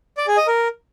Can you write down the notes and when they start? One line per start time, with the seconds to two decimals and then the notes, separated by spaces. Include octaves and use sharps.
0.17 D5
0.27 G#4
0.37 D#5
0.47 A#4